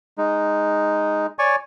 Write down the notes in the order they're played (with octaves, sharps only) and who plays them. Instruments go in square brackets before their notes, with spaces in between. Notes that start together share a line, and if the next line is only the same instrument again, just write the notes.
[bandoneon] G#3 D#4
C#5 D5 G#5 C#6